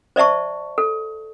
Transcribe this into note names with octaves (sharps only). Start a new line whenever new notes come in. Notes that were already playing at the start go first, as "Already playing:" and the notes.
C5 D5 E5 A5 C#6
A4